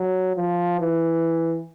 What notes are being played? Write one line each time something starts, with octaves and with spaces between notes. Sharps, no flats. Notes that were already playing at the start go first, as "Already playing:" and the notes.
Already playing: F#3
F3
E3